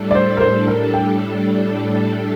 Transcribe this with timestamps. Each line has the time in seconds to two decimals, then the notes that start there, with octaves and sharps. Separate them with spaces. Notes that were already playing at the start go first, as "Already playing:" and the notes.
Already playing: A2 G3 D4 A4
0.11 D5
0.15 C5
0.37 A#4
0.41 C5
0.67 A#4
0.94 G5